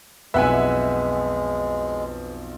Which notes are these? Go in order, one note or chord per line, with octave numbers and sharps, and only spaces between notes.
B1 F2 G#3 B4 E5 F#5 G#5